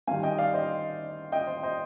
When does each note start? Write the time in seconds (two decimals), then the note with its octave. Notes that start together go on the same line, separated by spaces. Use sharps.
0.07 D#3 G3 C4 F5 G#5
0.23 D#5 G5
0.38 D5 F5
0.54 C5 D#5
1.32 D#5 G5
1.47 C5
1.63 C5 D#5